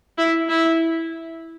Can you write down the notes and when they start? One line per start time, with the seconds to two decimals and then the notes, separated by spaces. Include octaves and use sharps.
0.18 E4
0.48 E4